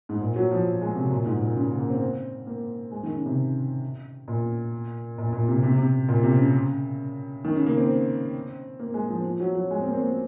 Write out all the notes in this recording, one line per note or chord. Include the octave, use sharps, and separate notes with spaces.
G#2
A#2
F#3
F3
G#3
C3
A#2
G#2
A#2
C#3
A#3
A#3
C4
A#3
G#3
D#3
C#3
C3
A#2
A#2
A#2
C3
C3
C3
A#2
C3
C#3
D#3
C#3
A#3
C4
A#3
G#3
F3
F3
F#3
F#3
G#3
C4
A#3
C4
A#3